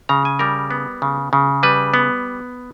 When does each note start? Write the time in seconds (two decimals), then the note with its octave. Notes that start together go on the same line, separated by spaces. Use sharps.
0.09 C#3 A#5
0.25 G#5
0.39 G3 A#4
0.71 B3
1.02 C#3
1.33 C#3
1.63 G3 B4
1.94 B3